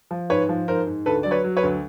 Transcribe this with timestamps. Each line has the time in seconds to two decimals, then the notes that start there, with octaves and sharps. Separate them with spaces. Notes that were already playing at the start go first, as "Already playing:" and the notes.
0.11 F3
0.30 G#2 B4 C#5
0.49 F3
0.68 G#2 A#4 C5
0.87 G#2
1.06 D2 A4 B4
1.23 F#3 D5
1.31 B4 C#5
1.44 F#3
1.57 B4 C#5
1.63 D2